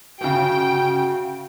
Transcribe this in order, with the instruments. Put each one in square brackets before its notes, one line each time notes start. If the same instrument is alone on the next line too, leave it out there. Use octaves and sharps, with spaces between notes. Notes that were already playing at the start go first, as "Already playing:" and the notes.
[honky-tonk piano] G1 C#3 [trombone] F#4 [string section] G5